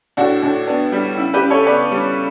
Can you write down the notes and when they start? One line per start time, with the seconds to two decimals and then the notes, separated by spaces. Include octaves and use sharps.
0.17 A2 D4 F#4
0.42 A2
0.67 B3 D4
0.92 G3
1.17 C#3 E4
1.34 G4 B4
1.42 C#3
1.50 A4 C#5
1.66 B3 B4 D5
1.91 G3